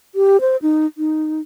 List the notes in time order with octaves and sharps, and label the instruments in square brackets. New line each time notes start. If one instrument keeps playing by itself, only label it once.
[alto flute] G4
C5
D#4
D#4